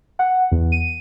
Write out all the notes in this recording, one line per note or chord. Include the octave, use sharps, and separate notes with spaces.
F#5
E2
D#7